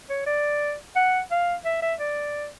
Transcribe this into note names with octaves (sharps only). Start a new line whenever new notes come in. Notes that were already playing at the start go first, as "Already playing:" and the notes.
C#5
D5
F#5
F5
E5
E5
D5